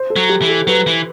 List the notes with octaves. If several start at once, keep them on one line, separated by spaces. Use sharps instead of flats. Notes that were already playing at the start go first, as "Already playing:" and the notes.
Already playing: C5
A4
F#3
G4
E3
A4
F#3 B4
E3